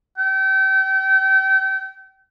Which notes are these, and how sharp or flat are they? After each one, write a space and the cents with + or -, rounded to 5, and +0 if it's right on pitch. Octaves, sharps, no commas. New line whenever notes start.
G5 -35